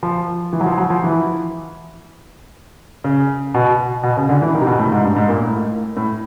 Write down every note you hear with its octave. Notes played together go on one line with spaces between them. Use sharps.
F3
E3
F#3
F3
F#3
F3
E3
C#3
B2
B2
C#3
D3
E3
D#3
C3
B2
A2
G#2
G2
G#2
A#2
A2
A2